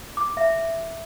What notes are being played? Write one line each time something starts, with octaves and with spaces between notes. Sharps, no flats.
D6
E5